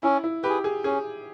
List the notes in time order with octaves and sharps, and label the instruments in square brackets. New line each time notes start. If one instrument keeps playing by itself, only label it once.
[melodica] C#4 [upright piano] E4
[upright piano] E4
[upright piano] G4 [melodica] B4
[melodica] G#4
[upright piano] G#4
[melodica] C#4 [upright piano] G#4